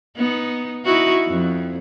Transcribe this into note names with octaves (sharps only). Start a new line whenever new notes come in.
B3 D#4
D#4 E4 F#4
F2